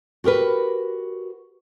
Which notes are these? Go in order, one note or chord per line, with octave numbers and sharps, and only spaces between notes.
F#4 G4 A#4 B4